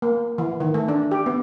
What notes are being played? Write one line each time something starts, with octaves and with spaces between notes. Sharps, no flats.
A#3
E3
D#3
A3
D4
G4
B3